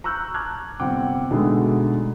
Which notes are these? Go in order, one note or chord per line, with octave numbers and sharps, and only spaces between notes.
A#5 C#6 E6 F#6 G6
A5 A#5 D6 F6 F#6 G#6
G1 C3 C4 F#5 G5 D6
B2 D3 G#3 A3 D4 D#4